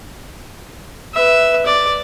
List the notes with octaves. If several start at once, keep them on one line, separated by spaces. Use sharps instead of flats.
B4 E5
D5